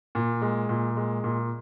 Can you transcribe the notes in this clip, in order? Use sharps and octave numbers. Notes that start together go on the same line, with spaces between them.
A#2
G#3
A#2
G#3
A#2